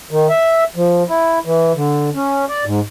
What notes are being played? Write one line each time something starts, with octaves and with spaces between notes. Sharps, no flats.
D#3
E5
F3
E4
E3
D3
C#4
D5
G#2